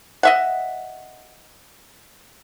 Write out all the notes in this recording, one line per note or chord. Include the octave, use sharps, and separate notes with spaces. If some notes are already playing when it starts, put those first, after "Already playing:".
D#5 E5 F#5